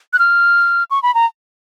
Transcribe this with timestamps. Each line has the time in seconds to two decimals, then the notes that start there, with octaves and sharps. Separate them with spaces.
0.13 F#6
0.19 F6
0.91 C#6
1.03 B5
1.15 A#5